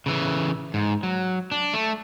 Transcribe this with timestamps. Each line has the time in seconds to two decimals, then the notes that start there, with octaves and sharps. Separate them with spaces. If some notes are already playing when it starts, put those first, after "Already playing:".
0.06 C#3 E3
0.74 G#2
1.03 F#3
1.52 D4
1.74 A3